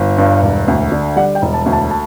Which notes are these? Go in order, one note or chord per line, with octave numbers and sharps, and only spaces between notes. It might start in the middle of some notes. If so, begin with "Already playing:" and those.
Already playing: G1
G2
E1
D2
D3
G3 F#5
G5
E1
A5
D2
A5
A5